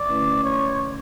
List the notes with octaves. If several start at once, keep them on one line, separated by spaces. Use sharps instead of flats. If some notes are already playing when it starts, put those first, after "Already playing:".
Already playing: D5
D3 A3 C#4 E4 B4
C#5